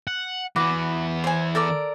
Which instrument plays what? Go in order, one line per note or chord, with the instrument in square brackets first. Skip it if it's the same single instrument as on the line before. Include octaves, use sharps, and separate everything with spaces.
[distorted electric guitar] F#5
[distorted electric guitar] E3 B3 [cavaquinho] F#4 B4 D6
[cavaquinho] C5 G#5
A4 A#4 D5